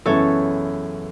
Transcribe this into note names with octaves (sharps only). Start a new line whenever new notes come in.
F#2 C#3 E3 B3 E4 A4 C#5